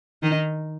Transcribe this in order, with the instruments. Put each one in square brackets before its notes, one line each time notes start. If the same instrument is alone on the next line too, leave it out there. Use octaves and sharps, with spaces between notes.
[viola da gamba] D#3 D#4